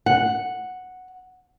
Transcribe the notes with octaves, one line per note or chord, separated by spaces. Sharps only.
F#5